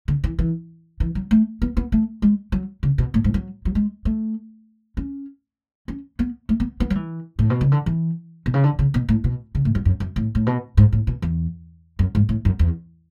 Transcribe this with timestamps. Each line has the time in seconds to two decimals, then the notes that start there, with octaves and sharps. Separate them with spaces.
0.08 D3
0.24 E3
0.39 E3
1.00 E3
1.15 F#3
1.31 A3
1.62 B3
1.77 B3
1.92 A3
2.22 G#3
2.52 F#3
2.83 C#3
2.98 B2
3.14 A2
3.24 G#2
3.34 F#3
3.65 F#3
3.75 G#3
4.05 A3
4.97 C#4
5.88 C#4
6.19 B3
6.49 A3
6.60 B3
6.80 B3
6.90 F#3
6.95 E3
7.39 A2
7.50 B2
7.61 C#3
7.72 D3
7.86 E3
8.46 B2
8.54 C#3
8.64 D3
8.79 C#3
8.94 B2
9.09 A2
9.24 B2
9.55 C#3
9.65 A2
9.75 F#2
9.85 F#2
10.00 F#2
10.16 A2
10.35 A2
10.46 B2
10.77 G#2
10.92 A2
11.07 B2
11.22 E2
11.99 F#2
12.15 G#2
12.29 A2
12.45 F#2
12.59 E2